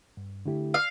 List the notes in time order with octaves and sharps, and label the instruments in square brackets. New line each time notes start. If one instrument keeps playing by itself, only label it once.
[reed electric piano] G2
D3 A3 E4 G4
[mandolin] F5